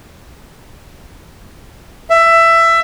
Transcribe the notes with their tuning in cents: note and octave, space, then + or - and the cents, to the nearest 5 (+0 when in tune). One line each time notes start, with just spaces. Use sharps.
E5 +15